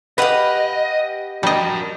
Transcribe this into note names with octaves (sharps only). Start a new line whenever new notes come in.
G4 B4 D#5 F5 F#5 B5
G3 F#4 A#4 D#5 A5